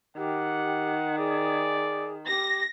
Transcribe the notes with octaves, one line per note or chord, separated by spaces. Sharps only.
D#3 G4 F#5
G#4 D5
G4 A#6